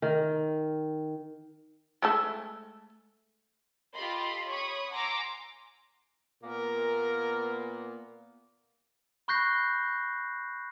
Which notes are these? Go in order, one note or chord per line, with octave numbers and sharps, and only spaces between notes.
D#3
G#3 A3 A4
F4 G4 A4 D#5 B5 C6
C#5 B5 C#6 D#6
F#5 G#5 A#5 C6 D6 E6
A#2 A#3 B3 A#4
B5 C#6 F#6 G6 A#6 C7